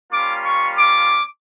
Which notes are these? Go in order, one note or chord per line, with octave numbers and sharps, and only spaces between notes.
G3 A#3 C#4 F4 D6
C#6
D6